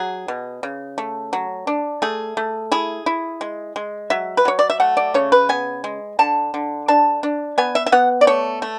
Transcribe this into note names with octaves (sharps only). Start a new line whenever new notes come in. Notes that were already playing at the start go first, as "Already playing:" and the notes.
Already playing: F#3 G#4
B2
C#3
A3
F#3
D4
A3 G#4
A3
E4 G#4
E4
G#3
G#3
F#3 E5
B4
F#3 C#5
D5
E5
A3 F#5
D5
C#3 C#5
B4
B3 G#5
G#3
D3 A5
D3
D4 A5
D4
B3 G#5
E5
E5
B3 F#5
D5
A3 C#5
A3